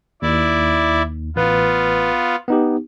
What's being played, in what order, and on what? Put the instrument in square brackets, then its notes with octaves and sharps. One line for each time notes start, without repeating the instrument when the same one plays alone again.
[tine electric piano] D#2 [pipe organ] E4 D5
[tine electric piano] A1 B4 [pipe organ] B3 F4
[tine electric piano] B3 D#4 G4